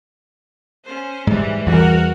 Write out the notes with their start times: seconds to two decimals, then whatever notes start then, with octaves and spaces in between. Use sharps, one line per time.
0.85 C#4 C5
1.27 G#2 E3 G3
1.66 E2 E3 G3 F#4 A#4